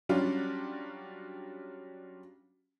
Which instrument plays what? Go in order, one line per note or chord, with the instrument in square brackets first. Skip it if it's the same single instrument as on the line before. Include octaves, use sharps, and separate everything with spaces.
[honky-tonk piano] F#3 G3 C#4 D4 F4 G4